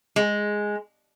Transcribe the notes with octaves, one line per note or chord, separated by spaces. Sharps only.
G#3